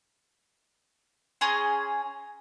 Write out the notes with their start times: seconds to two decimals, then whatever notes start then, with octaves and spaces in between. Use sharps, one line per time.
1.41 C#4 G#4 A#5 C6